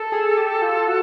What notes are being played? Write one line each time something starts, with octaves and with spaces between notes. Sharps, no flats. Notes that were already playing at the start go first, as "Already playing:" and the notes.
Already playing: A4
G#4
G4
F4
F#4